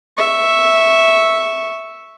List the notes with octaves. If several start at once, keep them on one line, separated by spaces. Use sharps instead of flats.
E5 C#6